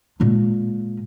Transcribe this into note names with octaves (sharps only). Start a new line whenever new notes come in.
A#2 G#3